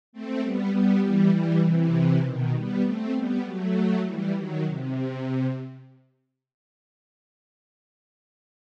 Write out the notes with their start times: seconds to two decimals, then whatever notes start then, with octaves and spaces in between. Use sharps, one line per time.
0.12 A3 C4
0.42 G3 B3
0.72 G3 B3
1.03 E3 G3
1.32 E3 G3
1.63 C3 E3
2.23 B2 D#3
2.54 G3 B3
2.84 A3 C4
3.14 G3 B3
3.44 F#3 A3
4.04 E3 G3
4.35 D#3 F#3
4.64 C3